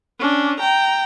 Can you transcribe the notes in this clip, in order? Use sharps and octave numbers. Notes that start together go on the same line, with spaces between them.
C#4 D4
G5 A#5